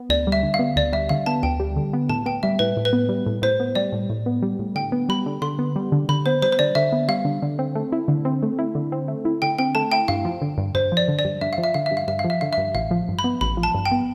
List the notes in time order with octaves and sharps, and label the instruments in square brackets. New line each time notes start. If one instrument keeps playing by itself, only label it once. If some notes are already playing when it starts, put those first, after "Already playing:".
Already playing: [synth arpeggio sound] B3
[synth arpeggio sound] D2 [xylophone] D5
[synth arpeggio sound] G3
[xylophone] E5
[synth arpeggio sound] D3
[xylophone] F5
[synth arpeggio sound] B3
[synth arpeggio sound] D2 [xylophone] D5
[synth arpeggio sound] G3 [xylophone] E5
[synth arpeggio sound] D3 [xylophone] F5
[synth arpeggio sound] B3 [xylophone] A5
[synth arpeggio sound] D2 [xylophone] G5
[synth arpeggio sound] G3
D3
B3
[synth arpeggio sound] A2 [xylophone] A5
[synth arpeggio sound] B3 [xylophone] G5
[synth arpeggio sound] G3 [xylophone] E5
[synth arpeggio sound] A2 [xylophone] B4
[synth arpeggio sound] A2
[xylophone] B4
[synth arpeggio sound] B3
G3
A2
[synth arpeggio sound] A2 [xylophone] C5
[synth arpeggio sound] B3
[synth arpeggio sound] G3 [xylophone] D5
[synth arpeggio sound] A2
A2
B3
G3
A2
[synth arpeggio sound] D3 [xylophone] G5
[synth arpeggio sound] B3
[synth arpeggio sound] G3 [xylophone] B5
[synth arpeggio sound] D3
[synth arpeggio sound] D3 [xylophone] C6
[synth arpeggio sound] B3
G3
D3
[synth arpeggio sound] D3 [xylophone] B5
[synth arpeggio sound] B3 [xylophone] C5
[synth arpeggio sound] G3 [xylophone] C5
[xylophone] C5
[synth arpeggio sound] D3 [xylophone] D5
[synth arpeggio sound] D3 [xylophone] E5
[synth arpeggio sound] B3
[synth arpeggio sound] G3 [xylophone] F5
[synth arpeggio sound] D3
D3
C4
A3
E4
D3
C4
A3
E4
D3
C4
A3
E4
[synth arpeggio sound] D3 [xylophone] G5
[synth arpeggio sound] C4 [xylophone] G5
[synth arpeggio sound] A3 [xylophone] A5
[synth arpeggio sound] E4 [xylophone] G5
[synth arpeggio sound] G2 [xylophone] F5
[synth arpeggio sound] F3
D3
G2
[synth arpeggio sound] G2 [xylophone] C5
[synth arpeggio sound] F3 [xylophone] D5
[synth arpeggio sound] D3
[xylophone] D5
[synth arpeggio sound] G2
[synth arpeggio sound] G2 [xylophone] E5
[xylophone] F5
[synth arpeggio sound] F3
[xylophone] E5
[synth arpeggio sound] D3 [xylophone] F5
[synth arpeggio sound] G2 [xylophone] E5
[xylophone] F5
[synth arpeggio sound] G2 [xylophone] E5
[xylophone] F5
[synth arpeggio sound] F3
[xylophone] E5
[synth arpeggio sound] D3 [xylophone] F5
[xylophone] E5
[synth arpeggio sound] G2
[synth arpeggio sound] A1 [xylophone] F5
[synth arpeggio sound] F3
G2
[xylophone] B5
[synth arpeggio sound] B3
[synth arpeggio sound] A1 [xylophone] B5
[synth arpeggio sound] F3
[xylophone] A5
[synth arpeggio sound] G2
[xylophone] G5
[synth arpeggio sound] B3